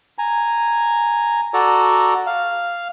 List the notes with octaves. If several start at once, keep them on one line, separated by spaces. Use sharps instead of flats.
G#5 A#5
F#4 A4 D5 A#5
F5